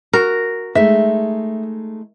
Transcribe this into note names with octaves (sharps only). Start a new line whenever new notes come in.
F#4 A#4
G#3 A3 D#4 E5